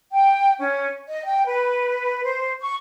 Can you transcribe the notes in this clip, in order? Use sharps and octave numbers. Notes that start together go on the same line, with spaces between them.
G5
C#4
D#5
G5
B4
C5
C#6